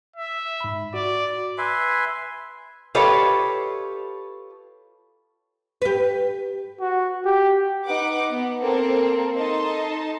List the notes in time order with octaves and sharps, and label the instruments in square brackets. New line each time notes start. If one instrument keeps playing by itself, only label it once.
[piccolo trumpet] E5
[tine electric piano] G#2 B5
[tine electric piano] F#4 [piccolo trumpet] D5
[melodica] B4 E5 G#5 C6
[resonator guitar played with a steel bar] F4 G4 A4 B4 C#5 D#5
[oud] G4 B4
[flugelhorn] F#4
G4
[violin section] D#4 B4 F#5 D6
B3
A#3 C4 A4 A#4
D#4 A4 D#5 A5 C6